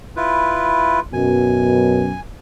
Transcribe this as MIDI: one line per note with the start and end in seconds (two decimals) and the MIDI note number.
0.16 1.00 64
0.16 1.00 65
0.16 1.00 71
1.13 2.11 42
1.13 2.11 47
1.13 2.20 80